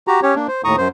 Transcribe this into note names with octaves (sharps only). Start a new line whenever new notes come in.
F#4 G4 A#5
C#4 G4 C#5
A#3 D4
C5
D#2 A2 A#5 C#6 D#6
F#2 C5